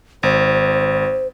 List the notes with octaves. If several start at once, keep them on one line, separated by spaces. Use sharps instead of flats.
G#1 C5